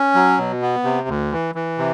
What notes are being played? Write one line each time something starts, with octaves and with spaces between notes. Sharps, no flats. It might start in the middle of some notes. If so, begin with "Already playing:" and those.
Already playing: C#4
F#3
B2
B3
C3
D2
E3
E3
C3